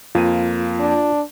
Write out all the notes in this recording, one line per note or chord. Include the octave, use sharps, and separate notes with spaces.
F2 A#3 F4 D#7
D4